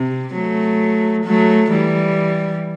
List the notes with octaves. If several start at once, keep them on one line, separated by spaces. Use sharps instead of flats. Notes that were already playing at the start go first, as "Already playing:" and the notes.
Already playing: C3
F#3 A3
F#3 A3
E3 G3